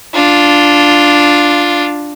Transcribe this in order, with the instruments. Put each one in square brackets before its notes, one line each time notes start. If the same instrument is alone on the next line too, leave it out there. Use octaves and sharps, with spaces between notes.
[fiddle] D4 F4